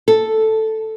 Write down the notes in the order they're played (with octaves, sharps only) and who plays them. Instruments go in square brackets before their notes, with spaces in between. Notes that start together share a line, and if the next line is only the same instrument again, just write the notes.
[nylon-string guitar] A4